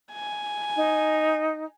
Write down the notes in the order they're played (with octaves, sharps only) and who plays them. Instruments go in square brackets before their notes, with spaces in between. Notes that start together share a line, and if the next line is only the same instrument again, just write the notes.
[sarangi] G#5
[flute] D#4